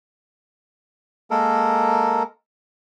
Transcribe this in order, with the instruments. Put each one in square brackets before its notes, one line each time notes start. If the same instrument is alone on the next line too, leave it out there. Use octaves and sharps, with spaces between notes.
[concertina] G#3 A#3 A4 A#4